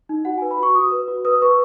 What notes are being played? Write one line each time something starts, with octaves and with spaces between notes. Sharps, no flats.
D#4
F#4 F#5
G#5
B4
B5
F#4 C#6
F#4 D#6
B4
F#4
B4 D#6
B4 C#6